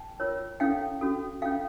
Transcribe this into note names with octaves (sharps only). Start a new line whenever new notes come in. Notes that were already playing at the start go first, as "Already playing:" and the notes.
Already playing: G5 A5
F4 A#4 C#5
C#4 E4 A4 F5 G5
C#4 F#4 A4
C#4 F4 A4 F5 G5